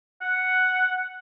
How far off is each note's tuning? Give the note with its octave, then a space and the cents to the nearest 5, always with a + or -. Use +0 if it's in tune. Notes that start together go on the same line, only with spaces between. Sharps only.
F#5 +5